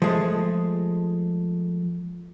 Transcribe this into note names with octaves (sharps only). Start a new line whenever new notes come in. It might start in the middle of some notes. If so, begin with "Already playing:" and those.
F3 G#3 A3